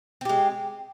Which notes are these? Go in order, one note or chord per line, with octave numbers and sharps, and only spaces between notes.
G#3 C4 G4